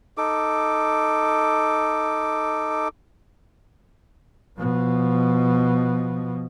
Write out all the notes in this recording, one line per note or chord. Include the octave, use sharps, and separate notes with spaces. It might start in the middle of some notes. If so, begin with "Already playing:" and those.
D#4 A4 D6
B2 F3